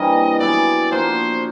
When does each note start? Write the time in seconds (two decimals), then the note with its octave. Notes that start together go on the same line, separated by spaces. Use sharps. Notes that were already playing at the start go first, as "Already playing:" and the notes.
Already playing: G2 E3 G3 A#3 C4 D#5
0.40 F#3 B3 E4 G#4 D5
0.91 F3 A#3 D4 F#4 C5